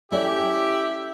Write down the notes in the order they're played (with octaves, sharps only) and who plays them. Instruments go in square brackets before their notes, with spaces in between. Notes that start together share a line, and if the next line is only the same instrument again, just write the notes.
[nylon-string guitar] C#4 A4 D5 [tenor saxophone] E4 [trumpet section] G4